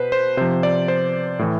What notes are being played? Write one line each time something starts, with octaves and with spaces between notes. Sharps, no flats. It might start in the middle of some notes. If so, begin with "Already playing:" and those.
Already playing: B2 B4 C5
C5
C3 F3 C5
D5
C5
A2 E3